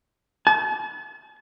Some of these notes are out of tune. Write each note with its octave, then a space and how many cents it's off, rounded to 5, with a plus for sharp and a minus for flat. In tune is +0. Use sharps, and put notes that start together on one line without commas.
A5 -40